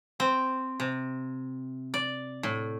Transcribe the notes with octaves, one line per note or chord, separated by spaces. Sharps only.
C4
C3
D5
A2